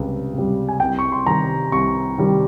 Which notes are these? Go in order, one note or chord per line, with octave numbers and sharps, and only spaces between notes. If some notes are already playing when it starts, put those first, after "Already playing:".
Already playing: C#2 C3 G3
C3 G3
G#5
C2 G5
C#6
C6
C3 D#3 G3 A#5
C2 C#6
C3 D#3 G3